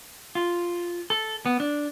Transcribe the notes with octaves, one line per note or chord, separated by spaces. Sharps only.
F4
A4
B3
D4